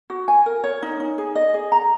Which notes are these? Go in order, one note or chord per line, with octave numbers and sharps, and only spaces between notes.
F#4
G#5
A#4
C#5
D#4
D#4
G#4
D#5
G#4
A#5